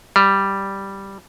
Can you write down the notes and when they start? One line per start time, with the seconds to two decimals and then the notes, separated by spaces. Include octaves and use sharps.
0.16 G3